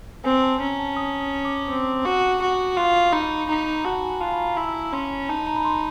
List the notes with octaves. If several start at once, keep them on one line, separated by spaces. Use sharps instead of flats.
C4 G#5
A5
C#4 A#5
A5
D#6
D#6
D6
C4 D6
F#4 C#6
F#4 C#6
F4 C6
D#4 B5
D#4 A#5
F#4 A5
G#5
F4 A5
B5
A#5
E4 B5
C#4 C6
D#4 A5
A#5
B5
C6